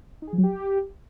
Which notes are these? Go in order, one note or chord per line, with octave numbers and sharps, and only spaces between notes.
D#4
G#4
F3
F#3
G4